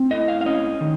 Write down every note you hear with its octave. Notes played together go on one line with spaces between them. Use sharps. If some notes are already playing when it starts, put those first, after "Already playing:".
Already playing: C4
A2 D#5
F5
F5
C#4 D#5
D#3